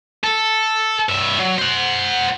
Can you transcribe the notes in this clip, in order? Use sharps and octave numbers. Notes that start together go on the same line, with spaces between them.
A4
G2 E5
F#3
C5 F#5